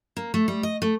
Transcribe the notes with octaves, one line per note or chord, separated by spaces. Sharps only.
A#3
A3
G3
D#5
A3